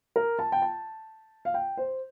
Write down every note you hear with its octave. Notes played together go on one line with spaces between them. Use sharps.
A#4
A5
G5
A5
F5
G5
C5